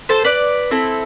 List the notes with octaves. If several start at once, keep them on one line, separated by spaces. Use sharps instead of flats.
A4 C5
B4 D5
C4 E4 A4